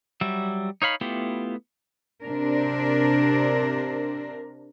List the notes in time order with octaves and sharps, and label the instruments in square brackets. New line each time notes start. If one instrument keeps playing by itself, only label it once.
[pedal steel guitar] F#3 G3 E5
D#4 C#5 F5 B5
A3 B3 E4 F4 G4
[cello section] C3 D4 A#4